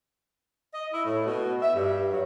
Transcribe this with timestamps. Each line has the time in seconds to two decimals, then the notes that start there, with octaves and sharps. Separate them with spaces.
0.73 D#5
0.93 E4
1.05 A2
1.25 B2
1.63 E5
1.75 G2
2.11 F#3